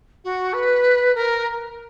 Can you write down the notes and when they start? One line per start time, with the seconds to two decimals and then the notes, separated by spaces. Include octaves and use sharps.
0.24 F#4
0.53 B4
1.14 A#4